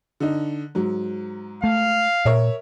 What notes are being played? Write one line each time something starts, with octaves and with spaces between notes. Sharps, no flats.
D3 D#4
G#2 F#3
A3 F5
A#2 A#4 C#5 E5